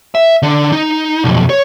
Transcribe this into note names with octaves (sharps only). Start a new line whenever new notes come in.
E5
D3 D4
D#4
B1 F2
C#5